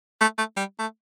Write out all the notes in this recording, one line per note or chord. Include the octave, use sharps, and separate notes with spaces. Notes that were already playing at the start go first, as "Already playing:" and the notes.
A3
A3
G3
A3